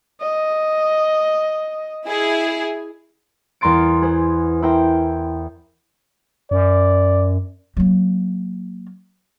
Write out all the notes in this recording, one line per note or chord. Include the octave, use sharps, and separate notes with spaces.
D#5
E4 G#4
E2 A#4 A#5 C6 A6 D7
G#4 B4 C5
E4 A#4 C5 G5
F#2 D5
F#3 A#3